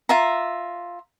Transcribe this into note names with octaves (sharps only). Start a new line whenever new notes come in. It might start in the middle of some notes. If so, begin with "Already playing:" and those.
F4 E5 A#5